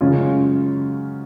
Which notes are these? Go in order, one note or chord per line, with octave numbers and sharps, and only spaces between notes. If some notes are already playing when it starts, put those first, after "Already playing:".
F#2 C#3 G#3 C#4 F4